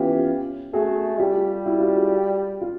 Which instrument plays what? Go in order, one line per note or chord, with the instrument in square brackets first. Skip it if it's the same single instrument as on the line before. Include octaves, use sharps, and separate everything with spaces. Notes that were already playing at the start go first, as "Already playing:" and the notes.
Already playing: [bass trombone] E3 [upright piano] B3 C#4 F4 G4
[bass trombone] A3 [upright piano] F#4 G#4
[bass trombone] G3 [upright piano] F4 G4
[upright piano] E4 F#4
F4 G4
F#4 G#4
F4